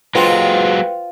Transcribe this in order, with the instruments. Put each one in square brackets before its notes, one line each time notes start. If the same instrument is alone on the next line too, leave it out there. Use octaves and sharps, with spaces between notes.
[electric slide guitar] F#3 G#3 [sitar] F4 [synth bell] B4 C5 G5